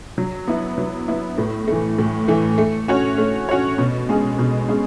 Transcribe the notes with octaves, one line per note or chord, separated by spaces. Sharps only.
F#3
B3 E4
F#3
B3 E4
A2
E3 A3
A2
E3 A3
A3
C#4 F#4 C#5
A3
C#4 F#4 C#5
B2
G#3 C#4 G#4
B2
G#3 C#4 G#4